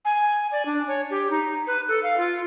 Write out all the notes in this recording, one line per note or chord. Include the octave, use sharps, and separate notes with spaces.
G#5
D5
D4
C#5
G4
D#4
B4
A4
F5
F4